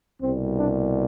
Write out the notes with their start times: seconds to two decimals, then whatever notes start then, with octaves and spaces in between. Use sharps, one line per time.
0.22 C2 B2 G3 C4
0.57 D4